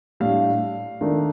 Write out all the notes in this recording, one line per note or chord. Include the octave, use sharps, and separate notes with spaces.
A2 G3 D4 F5
D#3 A3 D4